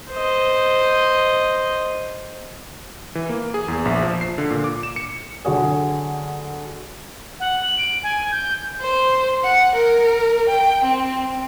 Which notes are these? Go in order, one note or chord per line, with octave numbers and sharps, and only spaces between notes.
C5 D#5
E3
A#3
G#4
E2
A#1
F3
C7
D3
A#2
D6
E7
C#7
D3 F#3 F#4 G#4
F#5
F#7
D7
G#5
G6
C5
F#5
A#4
G5
C4